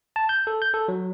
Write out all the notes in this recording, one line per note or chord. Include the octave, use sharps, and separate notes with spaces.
A5
G6
A4
G6
A4
F#3